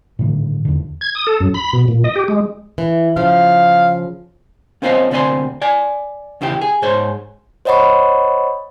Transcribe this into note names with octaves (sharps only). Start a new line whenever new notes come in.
A2 D3 D#3
E2 D3
G#6
D#6
A4
F#2
B5
B2
A#2
D#5
G4
G#3
E3
C#3 F3 F5
A#3 C4 C#4 F4 C5 D#5
D2 C3 C4 D5 G#5 C6
D5 G#5
E2 C#3 E4 G4
G#4
G#2 G#4 C5 C#5
C5 C#5 D#5 F#5 B5 C#6